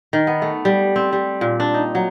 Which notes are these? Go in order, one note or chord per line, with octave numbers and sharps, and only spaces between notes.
D#3
B3
A3
G3
C4
G3
A#2
D4
D#4
F#3